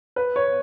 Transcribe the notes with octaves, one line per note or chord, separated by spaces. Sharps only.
B4
C#5